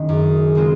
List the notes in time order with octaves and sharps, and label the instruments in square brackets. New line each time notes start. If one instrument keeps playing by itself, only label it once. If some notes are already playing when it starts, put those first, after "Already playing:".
Already playing: [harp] F#1 D#3
[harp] F#2 [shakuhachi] G#4
[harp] C#3 G#3 C4 F4